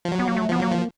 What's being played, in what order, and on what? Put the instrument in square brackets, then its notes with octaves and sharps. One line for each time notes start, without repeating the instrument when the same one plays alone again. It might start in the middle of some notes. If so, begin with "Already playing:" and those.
[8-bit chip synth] F3
F#3
[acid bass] B3
A#3
A3
[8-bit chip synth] F3 [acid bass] B3
[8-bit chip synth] F#3 [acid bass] A#3
[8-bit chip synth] F3